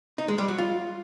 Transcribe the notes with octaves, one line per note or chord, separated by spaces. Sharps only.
D#4
G#3
G3
F#3
F4